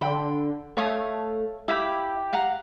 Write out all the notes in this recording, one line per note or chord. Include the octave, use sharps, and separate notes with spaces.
D3 G5 B5 C6
A3 C#5 F5 D#6
E4 G4 F5 B5
F5 F#5 A#5